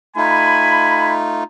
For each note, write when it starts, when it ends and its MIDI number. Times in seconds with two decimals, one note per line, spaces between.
0.16 1.44 57
0.16 1.44 63
0.16 1.44 65
0.16 1.12 80
0.16 1.12 83